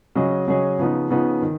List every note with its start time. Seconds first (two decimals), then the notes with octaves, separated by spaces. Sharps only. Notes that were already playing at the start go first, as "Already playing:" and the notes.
0.15 C#3 F#3 C#4 G#4 D#5
0.47 C#3 F#3 C#4 G#4 D#5
0.79 C#3 F3 B3 D#4
1.10 C#3 F3 B3 D#4
1.42 D#3